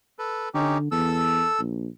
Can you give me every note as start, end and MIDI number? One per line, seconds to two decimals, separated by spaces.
0.19 0.49 69
0.19 0.49 71
0.54 0.89 50
0.54 0.78 61
0.54 0.78 63
0.54 0.78 67
0.92 1.46 40
0.92 1.60 69
0.92 1.60 88
1.59 1.87 34